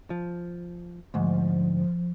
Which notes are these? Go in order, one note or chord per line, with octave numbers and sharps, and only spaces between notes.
F3
D2 G#2 F3